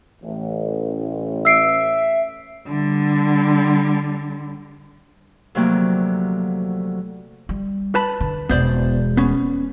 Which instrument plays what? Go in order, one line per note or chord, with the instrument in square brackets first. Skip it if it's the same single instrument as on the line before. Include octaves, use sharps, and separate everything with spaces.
[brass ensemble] A1
[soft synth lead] E5 [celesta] E6 C7 D7
[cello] D3 G3
[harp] D2 C3 F3 F#3 A#3 G5
[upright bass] G3
[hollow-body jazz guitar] B4 A5 B5
[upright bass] D3
[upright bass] E1 G#3 [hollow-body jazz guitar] B3 C5 D5
[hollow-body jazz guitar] B3 C#4